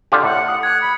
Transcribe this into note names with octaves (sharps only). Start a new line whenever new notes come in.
D3 F4 G4
A2 F#5
D#6 C#7
F#6 G#6 C#7
B5